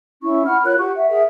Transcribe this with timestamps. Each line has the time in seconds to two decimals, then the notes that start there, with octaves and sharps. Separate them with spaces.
0.23 C#4 E4 C#6
0.45 F#5 B5 F6
0.64 F4 A#4 C#5 F#6
0.78 G4 F#5 C#6
0.95 E5 F#5
1.10 G#4 A#4 E5 F#5